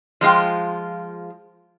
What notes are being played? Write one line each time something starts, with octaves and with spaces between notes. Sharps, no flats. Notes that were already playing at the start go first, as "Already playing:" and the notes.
F3 G#3 F4 G5